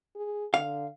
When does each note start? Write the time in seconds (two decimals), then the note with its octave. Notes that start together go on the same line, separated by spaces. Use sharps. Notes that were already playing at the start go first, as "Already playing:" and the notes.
0.16 G#4
0.54 D3 F5